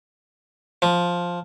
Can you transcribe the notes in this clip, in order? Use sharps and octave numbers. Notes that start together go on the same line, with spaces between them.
F3